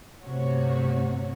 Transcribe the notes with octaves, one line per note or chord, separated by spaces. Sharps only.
G1 A2 C3 F#4 C#5